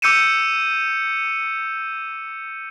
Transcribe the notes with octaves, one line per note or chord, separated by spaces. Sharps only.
D6 E6 G6 C#7 D#7 E7